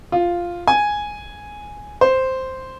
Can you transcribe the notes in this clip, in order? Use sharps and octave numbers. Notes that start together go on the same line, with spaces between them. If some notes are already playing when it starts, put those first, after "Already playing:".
F4
G#5
C5